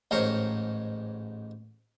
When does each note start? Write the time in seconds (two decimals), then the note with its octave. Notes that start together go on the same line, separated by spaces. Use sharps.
0.11 A1 G#2 A#4 C5 C#5